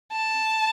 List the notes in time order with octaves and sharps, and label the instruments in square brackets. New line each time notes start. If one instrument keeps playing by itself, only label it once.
[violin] A5